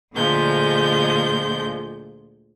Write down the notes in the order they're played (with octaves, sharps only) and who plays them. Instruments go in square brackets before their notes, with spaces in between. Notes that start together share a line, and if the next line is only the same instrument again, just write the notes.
[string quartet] D2 A#2 D3 F3 G#3 G6